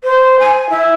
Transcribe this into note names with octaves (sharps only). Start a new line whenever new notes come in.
C5
G#5
E4